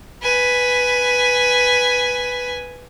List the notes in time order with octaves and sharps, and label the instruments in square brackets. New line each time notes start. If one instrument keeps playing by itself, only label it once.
[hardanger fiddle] B4 G#5